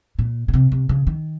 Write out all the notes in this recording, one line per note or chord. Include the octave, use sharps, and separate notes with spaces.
A#2
B2
C3
C3
C#3
D#3